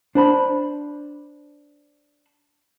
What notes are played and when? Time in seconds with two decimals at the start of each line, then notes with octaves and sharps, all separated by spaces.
0.15 D4 C5 B5